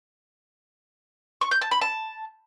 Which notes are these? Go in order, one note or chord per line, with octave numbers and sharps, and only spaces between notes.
C#6
G6
A5
B5
A5